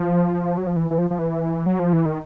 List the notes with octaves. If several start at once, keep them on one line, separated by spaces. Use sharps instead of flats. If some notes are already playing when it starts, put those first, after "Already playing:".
Already playing: F3
F#3
F3
E3
E3
F3
F3
E3
F#3
F3
E3
D#3